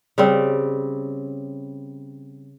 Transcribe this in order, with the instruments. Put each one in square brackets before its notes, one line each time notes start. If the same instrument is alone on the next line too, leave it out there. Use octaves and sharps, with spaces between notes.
[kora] C#3 G3 C4